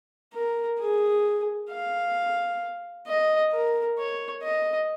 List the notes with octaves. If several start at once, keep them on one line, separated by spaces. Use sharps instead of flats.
A#4
G#4
F5
D#5
A#4
C#5
D#5